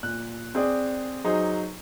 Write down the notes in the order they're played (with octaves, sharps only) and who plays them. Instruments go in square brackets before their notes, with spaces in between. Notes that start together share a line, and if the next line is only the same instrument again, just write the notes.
[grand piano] A#2 F#6
C4 G#4 D5
F#3 D#4 G#4 C5